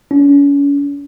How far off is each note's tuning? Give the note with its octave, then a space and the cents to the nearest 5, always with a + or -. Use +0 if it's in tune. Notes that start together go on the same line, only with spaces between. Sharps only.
C#4 +35